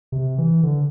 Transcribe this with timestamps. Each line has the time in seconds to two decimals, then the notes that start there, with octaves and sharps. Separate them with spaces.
0.12 C3
0.38 E3
0.63 D3